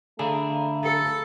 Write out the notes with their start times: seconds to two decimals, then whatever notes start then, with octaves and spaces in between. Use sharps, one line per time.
0.19 D3 A3 D4 G#4 F5 A#5 B5
0.84 A4